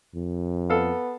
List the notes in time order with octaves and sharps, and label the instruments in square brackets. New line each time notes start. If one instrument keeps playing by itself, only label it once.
[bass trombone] F2
[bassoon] B3 [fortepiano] A4 F5